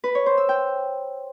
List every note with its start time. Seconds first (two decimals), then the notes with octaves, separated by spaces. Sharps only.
0.04 B4
0.15 C#5
0.26 C5
0.38 E6
0.49 G5